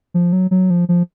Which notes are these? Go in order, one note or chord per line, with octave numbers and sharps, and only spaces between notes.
F3
F#3
F#3
F3
F3